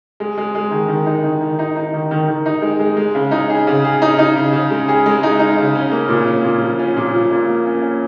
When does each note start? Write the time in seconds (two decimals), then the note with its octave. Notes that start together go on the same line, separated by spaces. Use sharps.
0.20 G#3
0.37 G#3
0.55 G#3
0.71 D#3
0.88 D#3
1.06 D#4
1.23 D#3
1.41 D#3
1.59 D#4
1.76 D#4
1.94 D#3
2.11 D#3
2.28 D#3
2.46 D#4
2.62 G#3
2.80 G#3
2.97 G#3
3.15 C#3
3.31 D#4
3.49 G#4
3.67 C#3
3.84 G#4
4.02 D#4
4.19 D#4
4.36 C#3
4.53 C#3
4.70 G#3
4.88 G#4
5.06 G#3
5.23 D#4
5.39 D#4
5.57 C#3
5.75 C#4
5.91 A#3
6.09 A#2
6.27 C#4
6.44 A#2
6.61 F3
6.79 C#4
6.97 A#2
7.13 F3
7.30 A#2
7.49 A#3
7.66 C#4
7.82 C#4